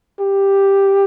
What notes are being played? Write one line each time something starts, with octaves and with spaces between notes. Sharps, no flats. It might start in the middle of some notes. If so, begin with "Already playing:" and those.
G4